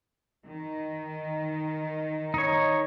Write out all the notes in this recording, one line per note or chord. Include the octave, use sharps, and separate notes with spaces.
D#3
D#4 C#5